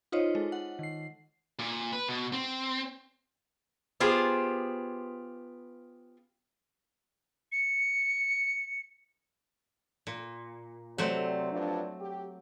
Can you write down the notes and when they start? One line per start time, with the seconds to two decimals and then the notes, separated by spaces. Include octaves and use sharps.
0.12 D#4 F4 C5 C#5 D#5
0.35 G#3 A4
0.52 F#5
0.79 D#3 C7
1.59 A#2
1.93 B4
2.08 B2
2.33 C4
4.00 B3 F4 G4 G#4 C5
7.52 C#7
10.07 A#2
10.98 C3 F#3 A3 C4 D5
11.52 G2 F3 D4
12.00 G4